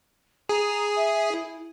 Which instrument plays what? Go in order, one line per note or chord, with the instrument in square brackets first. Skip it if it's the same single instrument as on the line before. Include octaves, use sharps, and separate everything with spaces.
[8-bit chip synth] G#4 [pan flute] A#5
[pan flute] E5
E4